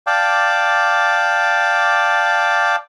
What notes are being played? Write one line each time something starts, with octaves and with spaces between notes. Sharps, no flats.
D5 F5 G5 A5 D6